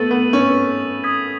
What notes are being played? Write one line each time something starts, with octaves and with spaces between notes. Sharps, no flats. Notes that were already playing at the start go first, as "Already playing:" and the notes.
Already playing: A3 B3 E6 A6 D#7 F#7
B3
C#4
D#6 G#6 B6 F#7